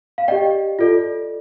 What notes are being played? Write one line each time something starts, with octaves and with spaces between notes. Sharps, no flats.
F5
G4 D5 D#5 G5
F4 A4 D5